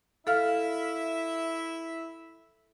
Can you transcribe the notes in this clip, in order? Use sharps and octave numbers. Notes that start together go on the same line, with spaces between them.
E4 A4 E5 F5 F6